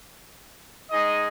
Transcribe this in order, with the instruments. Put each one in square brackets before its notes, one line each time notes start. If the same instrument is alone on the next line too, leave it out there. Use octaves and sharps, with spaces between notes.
[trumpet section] G#3 D#4 G#4 D#5